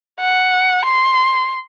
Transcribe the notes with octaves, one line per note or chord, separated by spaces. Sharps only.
F#5
C6